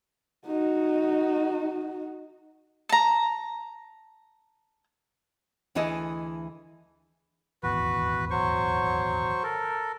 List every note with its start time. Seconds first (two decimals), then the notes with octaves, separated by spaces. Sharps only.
0.46 D#4 F#4
2.89 A5 A#5
5.75 D2 E3 E4 G#4 A4 D#5
7.63 D#1 G#1 E2 F#4 B4
8.31 F#3 C5 C#6
9.43 A4 A#4